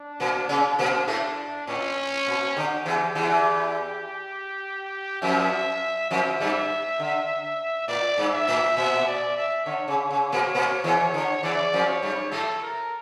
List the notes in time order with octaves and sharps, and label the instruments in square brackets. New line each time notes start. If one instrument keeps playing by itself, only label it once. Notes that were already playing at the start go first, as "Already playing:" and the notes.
Already playing: [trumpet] D4
[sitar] A#2 A#3
C#3 C#4
A#2 A#3
A2 A3
[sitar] A2 [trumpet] C#4
[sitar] A#2
[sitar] D3 [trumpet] G4
[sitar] E2 E3
E2 E3
[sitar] F2 F3 [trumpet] E5
[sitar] F2 F3 [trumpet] E5
[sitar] G2 G3
D3
[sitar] A2 [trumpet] D5
[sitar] G2
[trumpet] E5
[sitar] A2
[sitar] A#2 [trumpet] E5
[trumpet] D5
E5
[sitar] D3 [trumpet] C#5
[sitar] C#3
C#3
A#2 A#3
A#2 A#3
E2 E3
D3
[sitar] E2 E3 [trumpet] D5
[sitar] F2 F3
[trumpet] C#5
[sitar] G2 G3
[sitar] A2 A3 [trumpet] A4
[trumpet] A#4